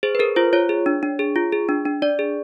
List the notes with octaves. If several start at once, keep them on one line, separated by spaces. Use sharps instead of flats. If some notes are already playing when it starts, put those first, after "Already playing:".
G#4 C5
B4
G#4 A#4
F4 C5
F4 C#5
G#4
D4
D4
G#4
F4
G#4
D4
D4
D4 D5
G#4